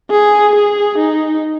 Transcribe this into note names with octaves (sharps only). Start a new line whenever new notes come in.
G#4
G#4
D#4